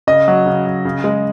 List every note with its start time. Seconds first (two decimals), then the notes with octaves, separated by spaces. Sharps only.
0.07 C#3 D#5
0.28 F#3
0.46 C#3
0.66 F#3
0.85 C#3
1.04 G#3